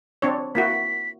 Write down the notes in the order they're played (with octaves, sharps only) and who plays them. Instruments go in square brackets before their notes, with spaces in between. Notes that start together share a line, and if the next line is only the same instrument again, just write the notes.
[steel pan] C4 D4 C#5
[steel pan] A#3 E4 F#4 [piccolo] B6